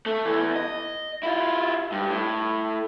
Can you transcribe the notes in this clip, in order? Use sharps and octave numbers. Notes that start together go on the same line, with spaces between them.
A3
E2 E3
D#5
E4 F4
G2
A2